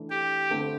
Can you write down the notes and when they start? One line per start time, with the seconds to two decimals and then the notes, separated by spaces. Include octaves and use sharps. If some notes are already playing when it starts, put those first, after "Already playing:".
Already playing: E3 A3 D4
0.10 G4
0.51 D3 A3 C4 E4